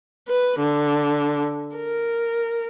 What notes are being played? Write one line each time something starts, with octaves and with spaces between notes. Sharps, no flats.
B4
D3
A#4